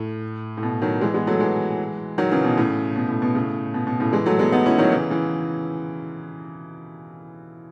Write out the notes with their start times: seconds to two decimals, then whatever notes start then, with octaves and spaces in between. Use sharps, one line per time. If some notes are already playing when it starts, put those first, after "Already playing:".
Already playing: A2
0.57 A2
0.63 B2
0.82 D#3 F#3
1.01 E3 G#3
1.14 G#3 B3
1.27 F#3 A3
1.40 E3 G#3
2.18 D#3 F#3
2.31 C#3 E3
2.44 B2
2.57 A2 C#3
2.96 B2
3.09 A2
3.22 B2
3.35 A2 C#3
3.74 B2
3.87 B2
4.00 A2 C#3
4.13 E3 G#3
4.26 F#3 A3
4.39 G#3 B3
4.52 B3 D#4
4.66 C#4 E4
4.78 D#3 F#3
4.92 C#3 E3
5.10 C#3 E3